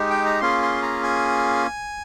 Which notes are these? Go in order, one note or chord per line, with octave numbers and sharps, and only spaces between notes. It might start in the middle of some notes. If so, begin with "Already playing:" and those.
Already playing: G#3 D#4 G4
G5
A#5
A#3 C#4 F4 G#4 C6
C6
A#5
G#5